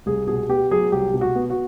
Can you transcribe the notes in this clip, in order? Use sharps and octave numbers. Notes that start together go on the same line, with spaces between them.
C2 G#4
B2 G#4
B3 G4
F#3 G#4
C2 G4
B2
F#4
B3
F#4